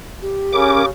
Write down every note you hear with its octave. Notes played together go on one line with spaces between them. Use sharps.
G4
C#3 C#4 A#4 D6